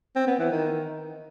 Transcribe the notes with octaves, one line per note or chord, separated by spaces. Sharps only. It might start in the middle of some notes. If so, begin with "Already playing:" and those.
C4
B3
E3
D#3